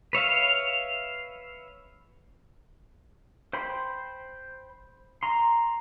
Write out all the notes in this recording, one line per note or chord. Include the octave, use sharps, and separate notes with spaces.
B4 C#5 E5 F5
C5 G5 B5 C6
A#5 C6